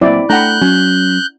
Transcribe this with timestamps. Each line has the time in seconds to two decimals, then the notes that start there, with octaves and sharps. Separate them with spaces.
0.01 A#2 F#3 C4 E4 D5
0.30 A3 D4 F#5 G5 A#5 B5 F#6 G6
0.61 F#3 C#4